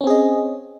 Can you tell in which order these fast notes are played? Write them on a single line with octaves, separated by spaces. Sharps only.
C#4 C4 G#4 D#5